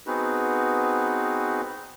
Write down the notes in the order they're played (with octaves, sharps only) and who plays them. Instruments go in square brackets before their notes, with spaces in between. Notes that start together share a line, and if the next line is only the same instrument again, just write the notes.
[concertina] B3 C4 D#4 F#4 G#4 B4